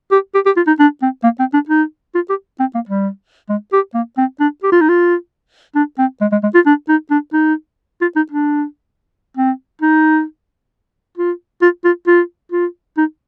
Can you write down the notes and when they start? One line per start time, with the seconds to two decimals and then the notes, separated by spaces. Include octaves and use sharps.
0.11 G4
0.34 G4
0.46 G4
0.57 F4
0.67 D#4
0.79 D4
1.02 C4
1.23 A#3
1.39 C4
1.54 D4
1.69 D#4
2.15 F4
2.29 G4
2.60 C4
2.75 A#3
2.89 G3
3.49 G#3
3.73 G4
3.94 A#3
4.18 C4
4.40 D4
4.63 G4
4.72 F4
4.81 D#4
4.89 F4
5.75 D4
5.99 C4
6.21 G#3
6.32 G#3
6.43 G#3
6.54 F4
6.66 D4
6.89 D#4
7.10 D4
7.33 D#4
8.01 F4
8.16 D#4
8.32 D4
9.37 C4
9.82 D#4
11.18 F4
11.62 F4
11.85 F4
12.07 F4
12.52 F4
12.97 D#4